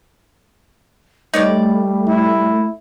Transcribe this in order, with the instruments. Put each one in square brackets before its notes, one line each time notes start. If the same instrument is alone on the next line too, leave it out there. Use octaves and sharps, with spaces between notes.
[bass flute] G3 [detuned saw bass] A3 [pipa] D#4 C#5 D5
[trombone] E4